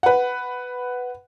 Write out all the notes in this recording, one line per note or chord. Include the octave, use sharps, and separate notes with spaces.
B4 F#5